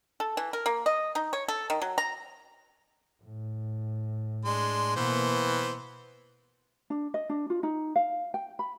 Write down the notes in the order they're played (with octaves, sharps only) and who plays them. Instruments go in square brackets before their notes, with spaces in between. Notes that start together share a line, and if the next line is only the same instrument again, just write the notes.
[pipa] A4
E3
A#4
A#3
D#5
D#4
C#5
A4
D#3
F#3
A#5
[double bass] A2
[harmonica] G#3 D4 C6
[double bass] B2 A#3 [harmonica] E3 B3 C5
[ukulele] D4
D#5
D4
F4
D#4
F5
G5
B5